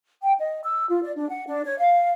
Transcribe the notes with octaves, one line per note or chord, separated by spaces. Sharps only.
G5
D#5
E6
F4
D5
D4
F#5
D4
C#5
F5